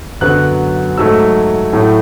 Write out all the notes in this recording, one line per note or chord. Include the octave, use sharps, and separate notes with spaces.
F#2 D3 F#3 B3 F#6
G#2 F#3 A3 E6
A2 F#3 A3